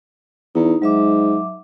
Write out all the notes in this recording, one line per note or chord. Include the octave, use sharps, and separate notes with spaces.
E2 D#4 A#5
G#2 F#3 E5 D6